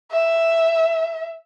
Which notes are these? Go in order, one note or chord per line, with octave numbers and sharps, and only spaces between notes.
E5